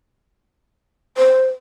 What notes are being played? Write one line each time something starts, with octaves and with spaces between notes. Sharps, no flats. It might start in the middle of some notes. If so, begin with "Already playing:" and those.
C5